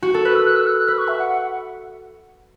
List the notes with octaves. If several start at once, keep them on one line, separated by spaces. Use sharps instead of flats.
F#4
A4
B4 F#6
E6
F#6
E6
F#6
F#6
B4 E6
C#6
E5
F#5
F#5